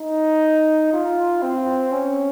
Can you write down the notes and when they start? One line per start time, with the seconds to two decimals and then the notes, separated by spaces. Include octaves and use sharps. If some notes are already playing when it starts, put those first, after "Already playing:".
Already playing: D#4
0.93 F4
1.42 C4
1.92 C#4